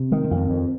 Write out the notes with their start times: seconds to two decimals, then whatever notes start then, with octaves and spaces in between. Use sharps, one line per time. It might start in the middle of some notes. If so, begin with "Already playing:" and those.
Already playing: C3
0.12 D#3 G#3
0.24 C4
0.31 F2
0.37 C4
0.50 F2